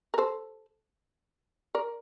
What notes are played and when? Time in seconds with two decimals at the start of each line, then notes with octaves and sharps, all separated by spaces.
0.14 A#4
0.18 A4 C5
1.75 A#4 D5